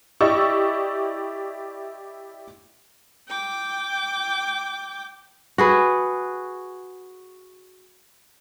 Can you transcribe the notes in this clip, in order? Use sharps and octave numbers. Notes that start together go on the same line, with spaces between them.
E4 G4 D5 D#5 C#6 E6
G5 D6
F#4 G#4 B4